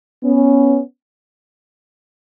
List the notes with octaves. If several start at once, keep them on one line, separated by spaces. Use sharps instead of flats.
B3 C#4